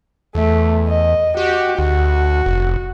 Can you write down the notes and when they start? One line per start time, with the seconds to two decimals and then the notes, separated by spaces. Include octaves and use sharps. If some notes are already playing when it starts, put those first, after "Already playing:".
0.35 E2 A3
0.88 D#5
1.37 F#4 G4
1.79 D2 F#4
2.46 F1